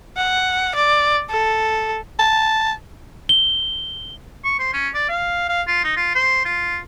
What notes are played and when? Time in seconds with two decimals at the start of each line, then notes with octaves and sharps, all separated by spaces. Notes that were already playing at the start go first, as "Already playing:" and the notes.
0.18 F#5
0.75 D5
1.30 A4
2.19 A5
3.29 G7
4.45 C#6
4.59 C5
4.73 C#4
4.94 D5
5.09 F5
5.49 F5
5.67 F4
5.84 D#4
5.96 F4
6.15 C5
6.45 F4